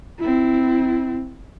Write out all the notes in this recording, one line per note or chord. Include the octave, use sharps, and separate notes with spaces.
C4 E4